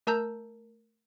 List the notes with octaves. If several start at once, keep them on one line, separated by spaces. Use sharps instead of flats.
A3 A#4 A5 A#5 E6 G6